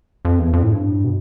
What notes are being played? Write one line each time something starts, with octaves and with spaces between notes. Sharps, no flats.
F2
E2
F2
A2
G2
B2